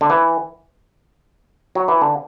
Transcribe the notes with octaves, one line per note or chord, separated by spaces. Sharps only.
D3
E3
F#3
E3
D3